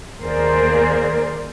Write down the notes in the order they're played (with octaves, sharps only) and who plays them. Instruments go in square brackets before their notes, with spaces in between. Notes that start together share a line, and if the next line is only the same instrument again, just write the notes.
[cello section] D#2 A#3 G#4 A#4 C5 D5